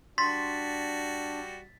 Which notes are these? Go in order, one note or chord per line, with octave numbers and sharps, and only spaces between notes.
G3 D4 F#4 C6 A6 B6